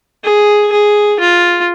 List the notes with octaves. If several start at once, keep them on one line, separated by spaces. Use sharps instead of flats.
G#4
G#4
F4